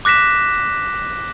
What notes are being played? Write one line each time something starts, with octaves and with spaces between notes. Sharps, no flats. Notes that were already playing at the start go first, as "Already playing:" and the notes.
D6 F#6 A#6 B6 E7